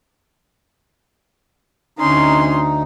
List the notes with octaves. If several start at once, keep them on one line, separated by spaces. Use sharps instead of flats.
D2 C#4 D#4 C6